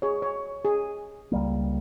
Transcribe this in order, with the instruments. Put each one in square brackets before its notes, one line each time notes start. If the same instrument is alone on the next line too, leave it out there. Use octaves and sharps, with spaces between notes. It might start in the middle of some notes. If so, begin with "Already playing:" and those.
[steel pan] G#4 C#5
C#5
G#4
[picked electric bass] C#2 G3 A#3